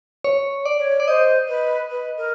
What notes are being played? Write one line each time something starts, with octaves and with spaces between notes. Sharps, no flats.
C#5
D5
C#5
D5
C5 D#5
B4
B4
A#4